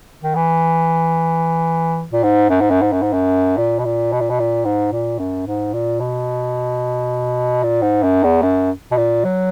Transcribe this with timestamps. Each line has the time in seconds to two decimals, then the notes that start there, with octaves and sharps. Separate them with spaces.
0.23 D#3
0.35 E3
2.12 A#2
2.24 G#2
2.50 F#2
2.61 G#2
2.70 F#2
2.82 G#2
2.92 F#2
3.02 G#2
3.13 F#2
3.58 A#2
3.79 B2
3.85 A#2
4.13 B2
4.20 A#2
4.30 B2
4.40 A#2
4.65 G#2
4.92 A#2
5.19 F#2
5.47 G#2
5.74 A#2
6.00 B2
7.63 A#2
7.82 G#2
8.03 F#2
8.24 E2
8.43 F#2
8.92 B2
8.97 A#2
9.24 F#3